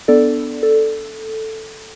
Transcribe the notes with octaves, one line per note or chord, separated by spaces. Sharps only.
B3 D4 A4 D5
A4